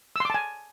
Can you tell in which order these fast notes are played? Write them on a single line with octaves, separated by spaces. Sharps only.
E6 C6 D6 A5 G#5